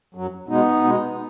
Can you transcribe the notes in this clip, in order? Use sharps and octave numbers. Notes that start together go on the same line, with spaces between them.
F#2 F#3
B2 G#3 B3 D#4
B2 G#3